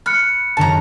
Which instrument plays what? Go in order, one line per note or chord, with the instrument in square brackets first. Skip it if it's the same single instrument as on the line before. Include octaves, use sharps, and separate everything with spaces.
[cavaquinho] B5 [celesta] F6 F#6 C#7
[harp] F#2 D3 D#3 [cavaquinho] A5 A#5